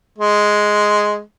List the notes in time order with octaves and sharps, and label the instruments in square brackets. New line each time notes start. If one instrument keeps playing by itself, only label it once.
[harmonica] G#3